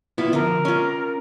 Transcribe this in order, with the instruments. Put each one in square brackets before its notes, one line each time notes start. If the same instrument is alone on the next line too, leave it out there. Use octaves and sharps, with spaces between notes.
[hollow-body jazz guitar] B3 E4 F4
[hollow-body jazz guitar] D3 F3 [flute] A#4
[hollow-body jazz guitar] C#4 F4